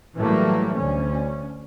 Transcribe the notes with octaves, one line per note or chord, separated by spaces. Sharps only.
A2 E3 F#3 G3 A3 A#3
D2 C#4